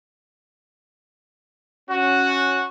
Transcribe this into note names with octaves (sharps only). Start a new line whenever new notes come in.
C#4 F#4